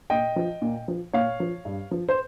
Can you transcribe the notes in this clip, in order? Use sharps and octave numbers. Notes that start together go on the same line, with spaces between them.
A#2 D#5 G5
F3
A#2
F3
A#2 C#5 F5
F3
G2
F3
C5